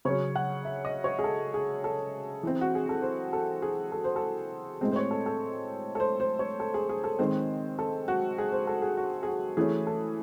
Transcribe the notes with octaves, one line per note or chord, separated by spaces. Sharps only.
C#3 F#3 C#4 C#5
F#5
E5
D#5
C#5
G#4
A4
G#4
A4
E3 C4
F#4
G#4
A4
C5
A4
G#4
A4
C5
A4
A2 G#3 C4 C5
C5
C#5
A4
A4
A4
C5
C5
C#5
A4
G#4
G#4
A4
D#3 G#3 C4 C5
A4
F#4
G#4
C5
A4
G#4
F#4
G#4
F#4
E3 A3 C#4 G#4
A4